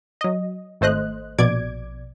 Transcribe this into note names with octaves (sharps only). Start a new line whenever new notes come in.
F#3 D#5
G#1 A3 C5 D#5 F#6
A#1 B2 D5 D6 G#6 D7